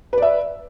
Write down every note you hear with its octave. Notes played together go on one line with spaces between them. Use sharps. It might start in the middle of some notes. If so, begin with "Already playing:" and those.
B4 D5 E5